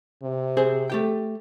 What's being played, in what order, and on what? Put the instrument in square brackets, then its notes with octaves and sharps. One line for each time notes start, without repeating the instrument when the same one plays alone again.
[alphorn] C3
[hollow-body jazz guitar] C4 G#4 C5
A3 G4 G5